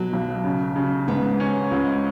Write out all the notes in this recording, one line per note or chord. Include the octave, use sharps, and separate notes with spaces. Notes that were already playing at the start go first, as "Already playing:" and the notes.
Already playing: B2 F#3
B1
C#3
C#3
G#2 B3
C#4
C#2